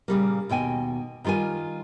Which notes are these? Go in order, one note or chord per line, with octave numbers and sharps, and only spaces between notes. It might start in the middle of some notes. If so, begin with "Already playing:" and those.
A#2 C#3 G3 A#3
D#2 B2 G5 G#5
D#3 G3 F4 A#4 G#5